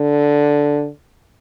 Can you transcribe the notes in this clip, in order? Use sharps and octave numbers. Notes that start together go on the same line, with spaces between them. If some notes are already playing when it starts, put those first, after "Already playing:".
Already playing: D3